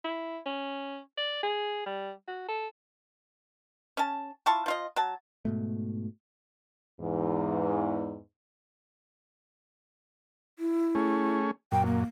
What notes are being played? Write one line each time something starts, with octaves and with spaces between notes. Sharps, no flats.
E4
C#4
D5
G#4
G3
F#4
A4
C#4 A5
E4 F4 A5 C#6
F3 F4 D#5
F#3 A5
G#2 B2 A3
E2 G#2
E4
A3 C#4 G#4
F#2 A#2 G5
A#3